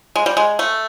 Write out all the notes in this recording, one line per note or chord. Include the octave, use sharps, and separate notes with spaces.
G#3
G3
G#3
A3